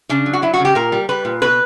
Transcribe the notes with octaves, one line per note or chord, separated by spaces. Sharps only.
C#3 D4
F#3
F#4
F#3 E4
F#4
C#3
G4
A#2 A#4
G3
G3 B4
A#2
B2 B4